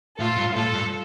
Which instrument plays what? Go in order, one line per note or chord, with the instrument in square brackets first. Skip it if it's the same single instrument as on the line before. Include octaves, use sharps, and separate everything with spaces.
[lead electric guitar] A2 [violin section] F4 A4
[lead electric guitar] G2
[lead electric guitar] A2 [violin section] F4 A4
[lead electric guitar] G2